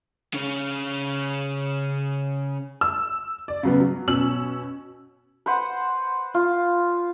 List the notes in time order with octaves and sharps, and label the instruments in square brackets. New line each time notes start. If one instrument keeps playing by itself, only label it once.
[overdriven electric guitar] C#3 C#4
[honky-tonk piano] E6
D5
C#3 F#3 B3
F#3
B2 C#4 E6 F#7
[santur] B4 C5 F#5
F4